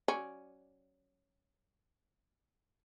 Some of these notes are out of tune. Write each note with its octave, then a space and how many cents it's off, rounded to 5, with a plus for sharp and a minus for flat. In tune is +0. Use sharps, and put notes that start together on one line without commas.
F#3 +20 C#4 +0 D5 +0